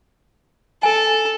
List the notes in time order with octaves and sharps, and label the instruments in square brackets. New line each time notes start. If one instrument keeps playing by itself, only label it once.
[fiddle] A4 [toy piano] G#5